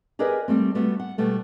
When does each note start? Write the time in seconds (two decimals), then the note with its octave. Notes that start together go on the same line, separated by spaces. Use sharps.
0.19 G4 G#4 A#4 B4 D5 D#5
0.48 G3 A3 C4
0.75 G3 A3 B3 F#4
1.00 F#5
1.18 B2 G3 A3 B3